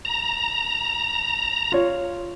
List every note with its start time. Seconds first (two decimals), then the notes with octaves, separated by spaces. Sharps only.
0.05 A#5
1.72 F4 C#5